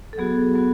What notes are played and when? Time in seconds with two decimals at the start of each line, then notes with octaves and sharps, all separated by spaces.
0.13 A4
0.18 F#3 B3 F#4 G#4
0.54 F#3 B3 F#4